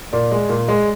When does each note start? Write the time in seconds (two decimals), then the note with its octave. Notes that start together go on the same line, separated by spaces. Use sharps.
0.13 A#2 D5
0.32 G#3
0.49 A#2
0.68 G#3